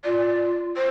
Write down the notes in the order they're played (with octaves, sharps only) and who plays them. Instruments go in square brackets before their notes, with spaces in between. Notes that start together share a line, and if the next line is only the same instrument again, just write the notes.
[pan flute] F4 [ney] D5
[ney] C5